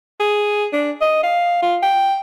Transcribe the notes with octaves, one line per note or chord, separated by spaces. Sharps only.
G#4
D4
D#5
F5
F4
G5